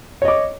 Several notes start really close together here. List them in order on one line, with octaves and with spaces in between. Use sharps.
C#5 D#5 D6